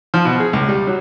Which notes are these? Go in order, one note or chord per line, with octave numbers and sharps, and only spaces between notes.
F3
B2
G#4
C#2
G3
F#3